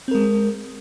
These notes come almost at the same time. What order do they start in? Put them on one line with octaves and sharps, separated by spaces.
C4 A#4 G#3